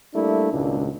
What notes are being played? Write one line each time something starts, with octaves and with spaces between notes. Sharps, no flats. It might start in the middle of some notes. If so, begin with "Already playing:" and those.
G3 A3 A#3 D4 E4
G#1 C#2 A#2 C#3 D4